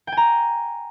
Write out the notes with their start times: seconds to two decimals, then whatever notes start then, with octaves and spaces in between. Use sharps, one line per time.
0.07 G5
0.12 G#5
0.17 A#5